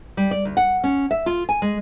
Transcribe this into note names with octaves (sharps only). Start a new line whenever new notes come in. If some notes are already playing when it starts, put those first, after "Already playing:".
G3
D5
D2
F#5
C#4
E5
F4
G#5
G#3